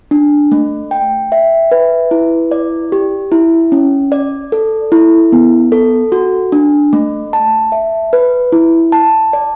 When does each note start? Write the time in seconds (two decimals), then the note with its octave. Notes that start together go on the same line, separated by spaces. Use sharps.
0.11 D4
0.52 A3
0.91 G5
1.32 E5
1.71 B4
2.11 E4
2.51 D5
2.92 G4
3.32 E4
3.72 C#4
4.12 D5
4.52 A4
4.92 E4
5.32 B3
5.72 A4
6.12 F#4
6.52 D4
6.93 A3
7.33 A5
7.72 E5
8.13 B4
8.52 E4
8.92 A5
9.33 D5